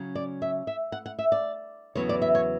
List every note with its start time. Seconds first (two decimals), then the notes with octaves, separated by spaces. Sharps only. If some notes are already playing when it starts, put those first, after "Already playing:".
Already playing: C#3 F#3 C#4
0.15 D5
0.42 E5
0.67 E5
0.92 F#5
1.06 F#5
1.19 E5
1.32 D5
1.95 E2 C#3 F#3 B3 C#5
2.09 D5
2.22 E5
2.35 C#5